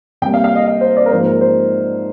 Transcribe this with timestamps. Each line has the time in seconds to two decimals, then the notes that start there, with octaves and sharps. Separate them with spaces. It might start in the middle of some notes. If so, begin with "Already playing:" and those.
0.22 C3 G3 A#3 G5
0.34 F5
0.44 F5
0.55 D#5
0.67 F5
0.81 C5
0.97 D5
1.06 A#4
1.11 G#2 F3 A#3 C5
1.26 A#4
1.41 C5